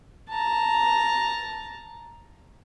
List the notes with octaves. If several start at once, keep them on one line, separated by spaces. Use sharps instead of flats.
A5 A#5